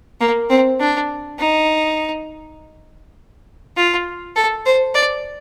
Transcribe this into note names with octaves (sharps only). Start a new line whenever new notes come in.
A#3
C4
D4
D#4
F4
A4
C5
D5